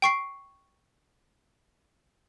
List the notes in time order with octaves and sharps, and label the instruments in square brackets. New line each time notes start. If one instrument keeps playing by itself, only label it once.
[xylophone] G5 C#6 C7